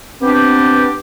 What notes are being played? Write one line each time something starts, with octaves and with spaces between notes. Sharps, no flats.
B3 C4 D4 G4